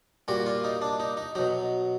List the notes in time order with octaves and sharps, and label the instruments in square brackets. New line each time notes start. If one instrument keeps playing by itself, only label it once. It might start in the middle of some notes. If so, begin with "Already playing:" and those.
[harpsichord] A#2 G3 F#4
F4
D#4
D4
D#4
D#4
B2 F#3 D#4